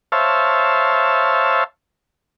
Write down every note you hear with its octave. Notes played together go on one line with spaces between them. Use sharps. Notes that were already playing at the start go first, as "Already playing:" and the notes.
C5 C#5 E5 F5 A5